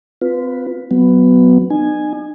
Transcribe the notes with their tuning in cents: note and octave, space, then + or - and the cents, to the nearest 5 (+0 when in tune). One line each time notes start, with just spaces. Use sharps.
C4 -30 F4 +15 B4 +0
F#3 +0 B3 +10
D#4 -45 G#5 +0